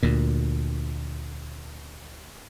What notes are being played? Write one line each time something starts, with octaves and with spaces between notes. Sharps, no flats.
D2 A#2